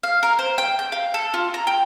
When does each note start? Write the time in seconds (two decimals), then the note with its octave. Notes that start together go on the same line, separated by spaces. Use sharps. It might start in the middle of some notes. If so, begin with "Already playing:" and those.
0.03 F5
0.23 A#4
0.39 C5
0.58 G5
0.79 G6
0.92 F5
1.14 A4
1.34 F4
1.54 A#5
1.67 G5